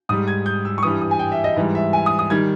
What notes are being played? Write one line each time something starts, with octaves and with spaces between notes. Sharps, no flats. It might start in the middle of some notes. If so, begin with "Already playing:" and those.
G#2 G3 D#6
G#6
G6
E6
C#6
G2 E3 G3 D#6
D#6
G#5
G5
E5
D#5
G#2 E3 G3
E5
G#5
D#6
D#6
D#3 G3 G#6